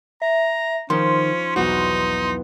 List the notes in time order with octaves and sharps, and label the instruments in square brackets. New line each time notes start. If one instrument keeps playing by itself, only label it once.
[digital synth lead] E5 [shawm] A#5
[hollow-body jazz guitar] D#3 [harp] F3 D#4 C5 [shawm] C#4 [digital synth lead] C6
[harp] B1 E2 B3 [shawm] D#4 [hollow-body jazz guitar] F#4